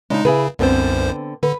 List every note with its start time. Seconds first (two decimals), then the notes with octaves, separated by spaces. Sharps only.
0.10 C#3 G#3 D4 D#4
0.25 C#3 E4 G#4 B4
0.59 C2 F#2 D3 B3 C4 C5
1.43 D3 B4